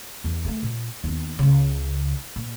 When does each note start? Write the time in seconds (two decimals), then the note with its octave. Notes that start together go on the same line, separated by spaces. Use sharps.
0.24 E2 E3
0.44 G2 A3
0.63 A#2
1.04 D#2 B3
1.39 C#2 C#3
2.36 A#2